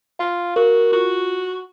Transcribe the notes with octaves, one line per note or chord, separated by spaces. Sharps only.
F4 F5
F#4 A#4
F4 F#4